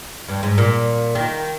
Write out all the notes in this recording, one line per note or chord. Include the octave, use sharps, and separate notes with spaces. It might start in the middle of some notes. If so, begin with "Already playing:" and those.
G2
G#2
A#2
D#3